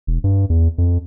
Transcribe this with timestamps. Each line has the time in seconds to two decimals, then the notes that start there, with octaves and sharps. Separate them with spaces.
0.07 E1
0.24 G2
0.50 E2
0.78 F2